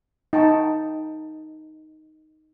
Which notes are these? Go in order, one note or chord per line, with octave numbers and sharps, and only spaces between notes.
D#4 G5 A5 C#6